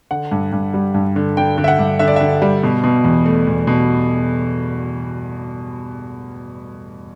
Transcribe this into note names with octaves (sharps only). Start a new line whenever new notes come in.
D3 F#5
G2
G2
G3
G2
D3
D3 G5
D3
E5
F#5
G2
D3 E5
D5
D3 E5
G3
B2
B2
E2
A3
E2
B2